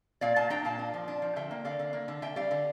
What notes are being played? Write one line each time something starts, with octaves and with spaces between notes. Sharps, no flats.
A#2 D5 F5
A#2 F5 A5
D4 G5 A#5
A#2 F5 A5
D4
F3
D4
F3
D3 E5 G5
A#3
D3 D5 F5
D3
A#3
D3
D3 E5 G5
G3 D5 F5
D3